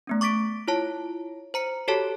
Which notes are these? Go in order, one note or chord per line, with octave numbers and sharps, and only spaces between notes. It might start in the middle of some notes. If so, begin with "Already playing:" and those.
A3 B3 C#4
C#6 D6 A6 B6 D7
E4 F4 C#5 A5
C5 A#5 C#7
F#4 G4 A4 C#5 A5